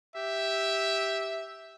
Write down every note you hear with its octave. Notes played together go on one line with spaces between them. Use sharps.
G4 E5